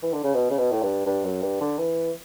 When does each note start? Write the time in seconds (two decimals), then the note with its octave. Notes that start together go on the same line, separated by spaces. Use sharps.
0.03 E3
0.13 D3
0.24 C#3
0.34 B2
0.51 C#3
0.58 B2
0.72 A2
0.82 G2
1.06 G2
1.24 F#2
1.42 G2
1.61 D3
1.78 E3